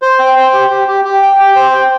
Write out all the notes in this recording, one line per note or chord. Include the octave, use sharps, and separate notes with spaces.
C5
G5
C5
G4
G4
G4
G4
G5
G4
C5
G5